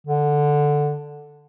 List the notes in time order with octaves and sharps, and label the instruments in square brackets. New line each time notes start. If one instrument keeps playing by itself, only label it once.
[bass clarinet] D3